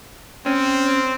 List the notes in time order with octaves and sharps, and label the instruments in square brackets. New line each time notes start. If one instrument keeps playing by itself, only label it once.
[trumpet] C4 [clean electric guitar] C#4